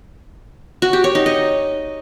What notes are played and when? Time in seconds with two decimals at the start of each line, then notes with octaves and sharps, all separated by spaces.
0.82 F#4
0.93 G4
1.04 C#5
1.15 D#4
1.26 D#5